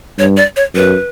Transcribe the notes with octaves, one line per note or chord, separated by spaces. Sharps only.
G2 C#5
D5
C#5
F#2 B4